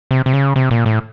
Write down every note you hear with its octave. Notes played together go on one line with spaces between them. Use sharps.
C3
C3
C#3
C3
A#2
A2